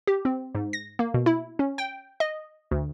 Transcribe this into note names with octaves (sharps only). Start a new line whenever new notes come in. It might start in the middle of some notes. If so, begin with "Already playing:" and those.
G4
C4
G#2
A#6
A#3
B2
E4
C#4
G5
D#5
D2